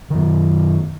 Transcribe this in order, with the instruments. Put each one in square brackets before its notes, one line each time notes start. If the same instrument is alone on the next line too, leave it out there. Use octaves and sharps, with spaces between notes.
[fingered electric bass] F#2 D#3